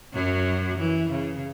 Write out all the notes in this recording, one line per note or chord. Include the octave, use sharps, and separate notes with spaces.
F#2 F#3
E3
C#3